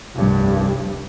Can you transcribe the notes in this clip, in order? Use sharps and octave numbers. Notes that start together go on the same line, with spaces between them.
F1 C2 G2